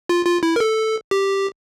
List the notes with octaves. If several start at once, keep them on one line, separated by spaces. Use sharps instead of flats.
F4
F4
E4
A#4
A4
G4